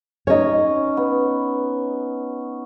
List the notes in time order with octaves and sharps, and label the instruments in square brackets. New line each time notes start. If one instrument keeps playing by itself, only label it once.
[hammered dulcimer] C#4 D#4 [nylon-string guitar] C#5 D#5
[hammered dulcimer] B3